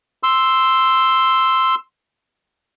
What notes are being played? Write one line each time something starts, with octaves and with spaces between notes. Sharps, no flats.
C6 E6